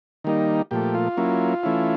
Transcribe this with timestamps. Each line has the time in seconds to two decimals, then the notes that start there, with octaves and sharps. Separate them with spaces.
0.24 D#3 G3 A#3 D#4
0.71 A#2 F3 A3 G4
0.95 F4
1.17 F#3 A#3 C#4 E4
1.63 E3 A3 C#4 E4